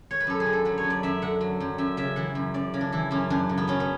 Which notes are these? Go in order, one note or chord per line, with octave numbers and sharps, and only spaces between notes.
C#5
B4
F#2 A4
G#4
D3
A4
F#3 B4
C#5
F#2
D5
F#2 E5
D3 F#5
F#3
F#2
F#2 E5
C#3 E5
E3 F#5
F#2
F#2 D5
C#3
D4
E3 E4
F#2 C#4
F#2 D4
C#3
B3
F#3 C#4
B3